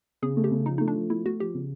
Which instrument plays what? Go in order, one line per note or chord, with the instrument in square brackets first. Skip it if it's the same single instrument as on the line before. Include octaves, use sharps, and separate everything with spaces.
[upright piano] C#3 [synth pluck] G#4
[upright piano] A3
[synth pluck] G4
[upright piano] C#3
[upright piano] F3 [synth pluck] D#4
[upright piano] A3 [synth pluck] D#4
[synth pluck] D4
[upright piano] F3
[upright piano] A3 [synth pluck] E4
[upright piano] A3 [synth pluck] F#4
[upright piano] F3 [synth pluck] G4
[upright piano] C#3